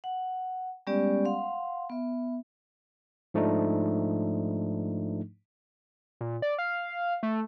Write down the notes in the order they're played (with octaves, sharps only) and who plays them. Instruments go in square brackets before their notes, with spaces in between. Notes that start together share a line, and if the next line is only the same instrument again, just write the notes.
[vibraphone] F#5
G3 G#3 B3 C#4 G4 D5
F5 F#5 C6
B3 E5
[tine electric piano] G#2 F3 A3 D4 D#4
[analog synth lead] A#2
D5
F5
A3